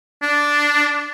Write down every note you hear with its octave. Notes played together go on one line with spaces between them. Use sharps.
D4